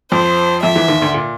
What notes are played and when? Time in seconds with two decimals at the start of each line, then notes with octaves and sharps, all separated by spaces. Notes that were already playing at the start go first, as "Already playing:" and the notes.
0.12 F2 F3 C5
0.63 F2 F3 E5
0.76 E2 E3
0.88 D#2 D#3
1.01 D2 D3
1.14 A#2